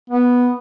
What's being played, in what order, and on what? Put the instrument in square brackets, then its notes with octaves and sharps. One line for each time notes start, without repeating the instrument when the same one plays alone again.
[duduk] B3